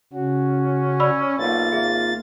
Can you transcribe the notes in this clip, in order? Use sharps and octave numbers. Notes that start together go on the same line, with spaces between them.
C#3 C#4 F#4
D5 B5 E6
B1 A#3 F4 A6
G#1 G#4 E5